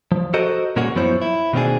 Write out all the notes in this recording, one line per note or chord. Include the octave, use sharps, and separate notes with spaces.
F3
F#4 A4 A#4 C5 D#5
A#2 G#3 A#3 C#4 F#4
F#2 F3 B3 E4 C5 C#5
E4
B2 D#3 A#3 C4 D4 G#4